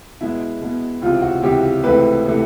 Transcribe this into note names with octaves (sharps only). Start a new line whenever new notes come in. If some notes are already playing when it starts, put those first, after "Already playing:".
B2 G#3 B3 E4
B2 G#3 B3
C#2 C3 E3 F4
F#4
C#2 C3 E3 G4
C#2 C3 E3 A3 B4
C3 E3 A3